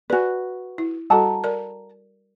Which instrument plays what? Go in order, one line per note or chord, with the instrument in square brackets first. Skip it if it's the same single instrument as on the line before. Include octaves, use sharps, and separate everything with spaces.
[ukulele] F#4 B4 [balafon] D5 G#5
[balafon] E4
[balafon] G3 F#4 A4 [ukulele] F#5 A5 A#5
[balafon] A#4 D5